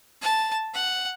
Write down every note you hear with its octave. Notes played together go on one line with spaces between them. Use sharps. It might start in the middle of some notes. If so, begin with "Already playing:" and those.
A5
F#5